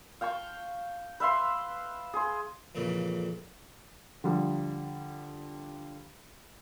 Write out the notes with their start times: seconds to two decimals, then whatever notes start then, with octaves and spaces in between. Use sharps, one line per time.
0.21 F5 G5 A5 C#6
1.20 B4 E5 F5 C6
2.14 G#4 C6
2.75 F2 A#2 C#3 E3
4.24 D3 F3 G3